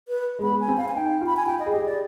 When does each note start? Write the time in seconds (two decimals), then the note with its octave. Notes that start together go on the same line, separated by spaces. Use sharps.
0.08 B4
0.39 G#3
0.43 B3 B5
0.60 G#5
0.68 C4
0.77 F5
0.88 G#5
0.94 D#4 G5
1.21 F4
1.27 B5
1.37 G#5
1.46 F4 G5
1.59 D#5
1.66 G#4
1.72 G4 D#5
1.86 D5